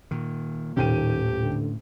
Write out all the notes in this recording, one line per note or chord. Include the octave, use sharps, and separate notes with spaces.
A#2 D#3
D#1 A2 D#3 C#4 G4 G5 D#7
D3